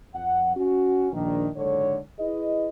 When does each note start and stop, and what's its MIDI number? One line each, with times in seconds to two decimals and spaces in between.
0.15 0.52 41
0.15 0.52 78
0.57 1.07 61
0.57 1.07 66
1.13 1.49 34
1.13 1.49 51
1.13 1.49 62
1.56 1.99 30
1.56 1.99 44
1.56 1.99 50
1.56 1.99 69
1.56 1.99 73
2.19 2.69 64
2.19 2.69 68
2.19 2.69 71
2.19 2.69 75